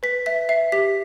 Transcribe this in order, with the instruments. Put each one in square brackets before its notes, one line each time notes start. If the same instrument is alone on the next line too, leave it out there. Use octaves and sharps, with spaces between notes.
[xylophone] B4 B6
E5 B6
E5 C7
G4 B6